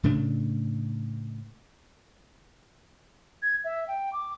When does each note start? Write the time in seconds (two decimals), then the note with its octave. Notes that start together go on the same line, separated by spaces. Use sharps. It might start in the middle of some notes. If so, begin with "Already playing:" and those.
0.03 A2 C#3 A3 D4
3.42 G#6
3.64 E5
3.88 G5
4.13 D6